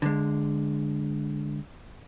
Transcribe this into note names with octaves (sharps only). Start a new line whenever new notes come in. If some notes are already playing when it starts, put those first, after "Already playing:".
D3 G#3